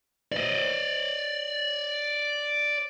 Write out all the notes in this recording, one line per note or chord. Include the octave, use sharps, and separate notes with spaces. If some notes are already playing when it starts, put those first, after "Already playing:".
D5 D#5